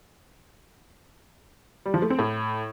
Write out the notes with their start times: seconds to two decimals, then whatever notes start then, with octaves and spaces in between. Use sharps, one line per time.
1.86 G3
1.94 F3
2.02 A3
2.10 C4
2.19 A2